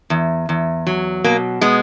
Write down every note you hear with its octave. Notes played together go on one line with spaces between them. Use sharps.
E2
E2
F#3
B2 A#3
G#3 B3